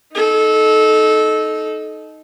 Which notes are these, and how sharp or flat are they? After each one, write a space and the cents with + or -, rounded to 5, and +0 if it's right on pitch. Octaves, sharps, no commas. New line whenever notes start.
D#4 +0 A4 -20